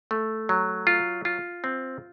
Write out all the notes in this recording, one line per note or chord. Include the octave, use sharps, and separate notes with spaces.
A3
F#3
F4
F4
C4